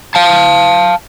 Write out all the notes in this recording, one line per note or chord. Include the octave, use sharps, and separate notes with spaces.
F5 A5